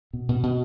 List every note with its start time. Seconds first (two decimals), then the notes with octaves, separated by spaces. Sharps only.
0.13 B2
0.29 B2
0.43 B2